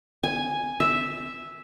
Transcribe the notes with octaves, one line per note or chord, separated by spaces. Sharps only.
G#5
E5